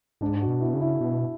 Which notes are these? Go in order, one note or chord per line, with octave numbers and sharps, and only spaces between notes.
G#2 D4
F#4
B2
E4
C#3
E4
B2